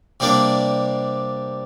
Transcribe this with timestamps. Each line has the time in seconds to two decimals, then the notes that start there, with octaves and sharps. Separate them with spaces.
0.20 C3 G3 A#3 D4